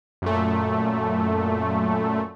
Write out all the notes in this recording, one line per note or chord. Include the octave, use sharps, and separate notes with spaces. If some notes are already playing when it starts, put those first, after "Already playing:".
F#2 A#2 A3